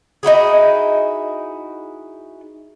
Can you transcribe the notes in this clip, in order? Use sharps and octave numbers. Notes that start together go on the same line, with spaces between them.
D#4 E4 F#4 G#4